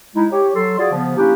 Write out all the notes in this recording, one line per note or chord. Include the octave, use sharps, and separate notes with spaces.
G#3 D#4 E4
G4 C#5
F#3 A4 C6
F4 F#4 G#4 D5
C#3 F3 B3
A#3 C#4 D4 E4 G4